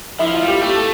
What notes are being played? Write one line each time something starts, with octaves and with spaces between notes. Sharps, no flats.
F3 E4
F4
G3
G4
A3 G4
A4